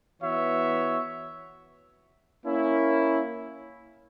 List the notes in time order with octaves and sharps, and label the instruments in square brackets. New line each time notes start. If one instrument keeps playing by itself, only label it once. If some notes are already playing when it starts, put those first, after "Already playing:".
[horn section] E3 B3 F#4 C#5 E5
A#3 C#4 E4